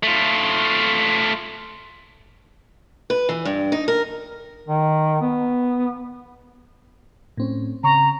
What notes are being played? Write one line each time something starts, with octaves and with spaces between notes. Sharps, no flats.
A3 F4
B4
E3
G2
D#4
A#4
D#3
B3
A2 C4 C#4
C#3 A#5 C#6